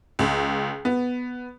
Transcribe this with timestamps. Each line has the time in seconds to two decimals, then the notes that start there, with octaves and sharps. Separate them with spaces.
0.19 C#2
0.85 B3